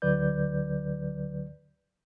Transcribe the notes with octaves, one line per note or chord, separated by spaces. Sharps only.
D2 D3 F#3 B4 D5 G6